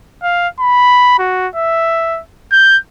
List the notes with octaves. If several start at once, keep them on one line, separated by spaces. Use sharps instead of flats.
F5
B5
F#4
E5
G6